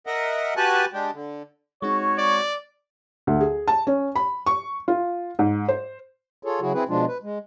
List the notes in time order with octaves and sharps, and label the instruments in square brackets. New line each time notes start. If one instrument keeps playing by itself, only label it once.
[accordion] A#4 D#5 E5 F#5
F#4 G4 B4 G#5 A5 F#6
G#3 D4 G4
D3
[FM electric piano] G#3 C4 D#4 [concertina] F#4 [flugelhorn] C#5
[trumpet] D5
[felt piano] D2
G#4
A5
C#4
B5
C#6
F4
G#2
C5
[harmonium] F4 G#4 A4 C#5
C#3 F#3 E4 F#4 G#4
C4 E4 G#4 B4
B2 F3 G#3 D4 F4
B4
G#3